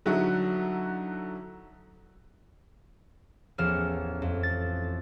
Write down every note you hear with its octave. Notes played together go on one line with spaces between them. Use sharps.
D3 F#3 D#4 E4 F#4
A1 E2 F3 F6 E7
F2
A6